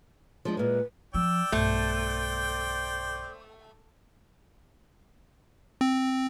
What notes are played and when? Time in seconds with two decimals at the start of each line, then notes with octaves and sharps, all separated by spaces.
0.45 F3 G#3 D4
0.57 A#2 G#3 B4
1.14 F3 D4 D5 G5 E6
1.52 B1 G2 A3 C5
5.81 C4